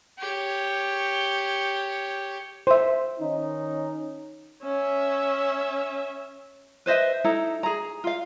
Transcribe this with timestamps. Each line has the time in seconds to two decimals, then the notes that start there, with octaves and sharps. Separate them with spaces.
0.19 G4 C#5
2.67 C5 E5
3.20 D#3 C#4 D#4
4.64 C#4 E5
6.86 B4 C5 D#5 E5
7.24 D#4 E4 A4 A#5
7.63 G#4 A#5
8.04 F4 F5